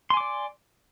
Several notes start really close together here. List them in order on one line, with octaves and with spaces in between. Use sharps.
C6 G#5 D6 D5